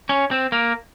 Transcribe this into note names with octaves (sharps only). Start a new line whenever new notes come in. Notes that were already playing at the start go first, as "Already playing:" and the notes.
C#4
C4
A#3